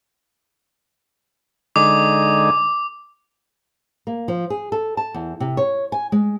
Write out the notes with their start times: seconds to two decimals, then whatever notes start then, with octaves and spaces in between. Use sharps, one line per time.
1.76 D3 G#3 D#4 D6
4.07 A#3
4.28 F3
4.50 G#4
4.72 A4
4.97 A5
5.14 E2
5.40 C3
5.57 C#5
5.92 G#5
6.12 G#3